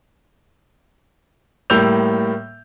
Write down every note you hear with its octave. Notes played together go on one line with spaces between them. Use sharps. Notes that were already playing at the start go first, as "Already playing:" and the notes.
A2 G3 A#3 E6 G6 F7